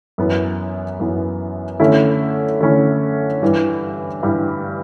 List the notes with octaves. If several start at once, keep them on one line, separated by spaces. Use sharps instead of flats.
F#2 E3 B3
F#2 E3 B3
D3 A3 C#4 E4
D3 A3 C#4 E4
G2 E3 G3
G2 E3 G3